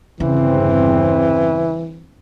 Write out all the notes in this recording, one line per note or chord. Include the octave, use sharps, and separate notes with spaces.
G1 E2 C#3 E3 C4